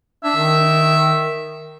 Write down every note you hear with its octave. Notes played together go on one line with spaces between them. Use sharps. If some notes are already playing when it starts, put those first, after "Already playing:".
D4 E5
D#3